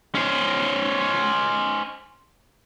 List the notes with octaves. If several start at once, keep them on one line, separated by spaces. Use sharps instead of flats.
C#4 C5